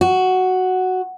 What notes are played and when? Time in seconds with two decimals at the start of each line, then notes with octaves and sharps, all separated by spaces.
0.01 F#4